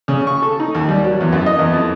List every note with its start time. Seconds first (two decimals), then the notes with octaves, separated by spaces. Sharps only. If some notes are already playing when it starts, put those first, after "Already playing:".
0.08 C#3
0.27 C#6
0.42 A4
0.60 D#4
0.75 D#2
0.89 G3
1.04 F#3
1.20 E2
1.33 F#2
1.46 D#5
1.59 E2
1.73 F2